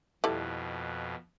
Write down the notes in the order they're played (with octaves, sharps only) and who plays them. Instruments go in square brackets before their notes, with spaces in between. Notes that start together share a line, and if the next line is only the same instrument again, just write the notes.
[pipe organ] F2 B2 [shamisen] G3 E4 A4